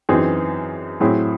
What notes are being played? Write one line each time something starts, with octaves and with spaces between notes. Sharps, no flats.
F#2 E3 C4 D#4 G#4
A2 F#3 C4 E4 G#4